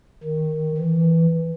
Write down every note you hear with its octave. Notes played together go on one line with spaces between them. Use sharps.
D#3
E3